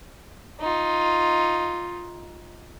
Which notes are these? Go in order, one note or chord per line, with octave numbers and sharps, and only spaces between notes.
D#4 F4